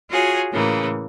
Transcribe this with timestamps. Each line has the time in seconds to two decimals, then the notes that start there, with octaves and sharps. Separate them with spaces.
0.10 F4 F#4 G#4 C#5
0.52 A2 C#3 E3 A#3